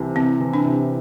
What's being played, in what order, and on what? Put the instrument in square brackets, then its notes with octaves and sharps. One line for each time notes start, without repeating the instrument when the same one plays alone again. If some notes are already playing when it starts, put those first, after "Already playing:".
Already playing: [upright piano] C2 C3 E3
[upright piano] C2 [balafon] C4
[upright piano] E3
[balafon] D4
[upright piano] C3